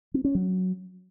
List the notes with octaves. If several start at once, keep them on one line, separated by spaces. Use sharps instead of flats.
C4
C#4
F#3